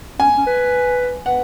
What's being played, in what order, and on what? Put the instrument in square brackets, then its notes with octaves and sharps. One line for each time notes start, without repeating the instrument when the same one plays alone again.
[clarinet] C#4 [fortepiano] G#5
[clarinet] C#4
B4
[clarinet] B4 [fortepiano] F#5